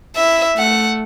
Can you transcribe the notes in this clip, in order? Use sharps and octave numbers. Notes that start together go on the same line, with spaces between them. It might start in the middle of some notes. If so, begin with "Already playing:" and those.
E4 E5
A3 F#5